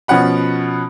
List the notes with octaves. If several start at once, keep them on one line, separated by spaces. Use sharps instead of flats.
B2 F3 C#4 F#5 B5